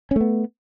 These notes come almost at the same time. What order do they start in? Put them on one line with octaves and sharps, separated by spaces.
C#4 A3 B3